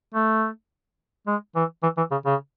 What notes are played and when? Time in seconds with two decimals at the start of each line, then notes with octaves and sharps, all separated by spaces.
0.14 A3
1.27 G#3
1.55 E3
1.83 E3
1.97 E3
2.11 C#3
2.26 C#3